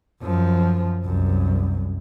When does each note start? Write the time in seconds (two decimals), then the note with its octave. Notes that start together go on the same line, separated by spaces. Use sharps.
0.22 F#2 F3
1.05 C2 F#2